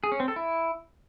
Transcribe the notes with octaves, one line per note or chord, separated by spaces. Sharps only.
G#4
C#4
C4
A4
E4